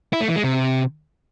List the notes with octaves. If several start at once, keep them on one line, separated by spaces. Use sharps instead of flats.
E4
A3
E3
G#3
C3